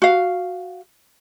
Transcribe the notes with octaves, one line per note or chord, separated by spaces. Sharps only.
F#4 F5